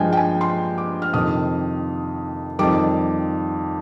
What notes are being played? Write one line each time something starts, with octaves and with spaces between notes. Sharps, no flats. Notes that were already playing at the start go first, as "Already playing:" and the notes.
Already playing: G2 F3 G#3 G5 G#5
G5
G#5
C6
D6
F6
F2 C3 D#3 D#6
F2 D#3 G3 D6